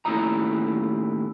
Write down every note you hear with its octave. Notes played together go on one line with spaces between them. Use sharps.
D#2 A2 C#4 E4 D#5 A#5